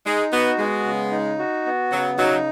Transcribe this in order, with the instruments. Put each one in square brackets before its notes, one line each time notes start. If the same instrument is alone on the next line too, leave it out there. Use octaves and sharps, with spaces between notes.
[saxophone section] G#3 [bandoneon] D#4
[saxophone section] B3 [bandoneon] F#4
[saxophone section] G#3 [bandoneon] B3
[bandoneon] C#3
D#4
F#4
B3
[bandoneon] C#3 [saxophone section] F#3
[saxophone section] F#3 [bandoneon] D#4